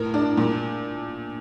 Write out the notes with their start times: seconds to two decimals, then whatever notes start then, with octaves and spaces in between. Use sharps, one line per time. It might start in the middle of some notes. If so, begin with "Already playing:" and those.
Already playing: A2 A#4
0.14 D4
0.37 A#2